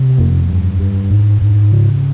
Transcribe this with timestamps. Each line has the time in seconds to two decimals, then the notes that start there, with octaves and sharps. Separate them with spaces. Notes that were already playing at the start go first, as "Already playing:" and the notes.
Already playing: C3
0.18 F2 A#3
0.49 G2
0.79 G2
1.10 G#2
1.41 G#2
1.72 C#3